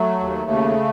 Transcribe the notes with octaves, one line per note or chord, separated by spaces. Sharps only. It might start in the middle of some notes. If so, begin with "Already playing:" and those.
Already playing: F#3 A3
D#2
C#3